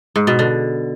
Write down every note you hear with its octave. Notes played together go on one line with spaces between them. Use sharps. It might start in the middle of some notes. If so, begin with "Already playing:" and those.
G#2
B2
D3